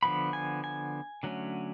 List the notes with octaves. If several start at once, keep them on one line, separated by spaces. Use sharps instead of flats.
D3 F3 B3 B5
G#5
G#5
D3 F#3 A3 C#4